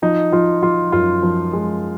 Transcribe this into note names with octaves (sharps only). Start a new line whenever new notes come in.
F3 D#4
F3 F4
F3 F4
F#2 F4
F3
G#3